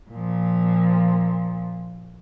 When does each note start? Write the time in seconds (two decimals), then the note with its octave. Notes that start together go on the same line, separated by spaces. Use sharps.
0.11 A#2 F3